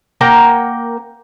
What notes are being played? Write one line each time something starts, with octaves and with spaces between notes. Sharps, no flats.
A#3 A#4 F#5 G5